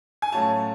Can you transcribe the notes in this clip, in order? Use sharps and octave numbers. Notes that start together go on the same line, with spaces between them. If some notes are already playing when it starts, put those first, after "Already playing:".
G#5
A2 F#3 A3 C#4 F4 A5